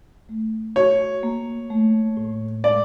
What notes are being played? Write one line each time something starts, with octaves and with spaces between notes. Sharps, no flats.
A3
F#4 C#5
A#3
A3
A2
G#3 D5